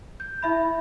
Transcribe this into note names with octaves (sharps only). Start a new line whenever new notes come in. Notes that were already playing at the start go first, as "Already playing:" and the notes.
G6
E4 E5 B5